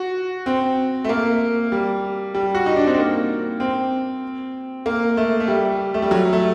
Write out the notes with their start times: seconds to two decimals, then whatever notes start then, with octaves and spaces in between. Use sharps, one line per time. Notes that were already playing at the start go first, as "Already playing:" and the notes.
Already playing: F#4
0.46 C4
1.04 A3
1.09 A#3
1.72 G3
2.35 G3
2.55 F#4
2.66 D#4
2.76 D4
2.86 C4
2.98 A#3
3.60 C4
4.86 A#3
5.17 A3
5.40 A3
5.48 G3
5.94 A3
6.02 G3
6.11 F#3
6.33 A3